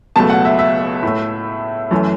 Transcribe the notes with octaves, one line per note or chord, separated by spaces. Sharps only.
C#2 B2 F#3 A3 A5
F#5
E5
E5
A2
A3
F#2 E3 A3